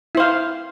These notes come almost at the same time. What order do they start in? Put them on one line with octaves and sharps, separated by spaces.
E4 C5 F5